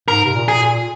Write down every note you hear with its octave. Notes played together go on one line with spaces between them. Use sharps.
G#2 A#4
C3
A#2
G#4
A#2